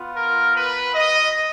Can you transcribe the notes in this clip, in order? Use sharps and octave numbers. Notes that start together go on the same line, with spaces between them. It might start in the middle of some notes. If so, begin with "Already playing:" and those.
Already playing: B3 F4
A#4
B4
D#5